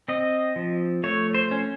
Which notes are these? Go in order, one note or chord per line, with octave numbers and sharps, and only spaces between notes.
C4 D#5
F3
A3 C#5
C5
C#4